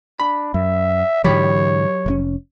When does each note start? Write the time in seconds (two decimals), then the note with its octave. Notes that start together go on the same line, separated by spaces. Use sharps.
0.20 D4 B5
0.54 F#2 E5
1.24 G#2 D3 E3 F#3 G4 C#5 B5
2.06 F1 C3 C#4